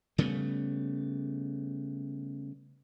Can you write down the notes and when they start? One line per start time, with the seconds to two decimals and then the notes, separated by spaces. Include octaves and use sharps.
0.18 C#3 G3 A3 B3